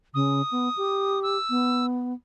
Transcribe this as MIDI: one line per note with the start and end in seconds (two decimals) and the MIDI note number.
0.14 0.42 49
0.14 1.19 87
0.51 0.69 59
0.77 1.37 67
1.23 1.86 88
1.50 2.13 59